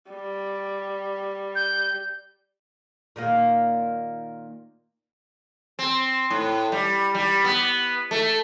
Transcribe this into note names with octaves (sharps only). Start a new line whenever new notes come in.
G3
G6
A#2 D#3 A#3
C4
A2
G3
G3
B3
A3